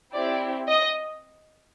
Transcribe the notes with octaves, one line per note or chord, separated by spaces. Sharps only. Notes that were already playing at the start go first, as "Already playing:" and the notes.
C4 E4 G4 D5
D#5